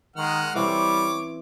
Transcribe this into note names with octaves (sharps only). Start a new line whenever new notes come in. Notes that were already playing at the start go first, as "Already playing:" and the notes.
D#3 G#3 F#5 F6
E3 G3 C4 C#4 C#5 D6